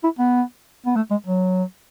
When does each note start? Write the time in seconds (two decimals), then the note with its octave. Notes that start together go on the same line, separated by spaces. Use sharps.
0.04 E4
0.19 B3
0.86 B3
0.96 A3
1.11 G#3
1.26 F#3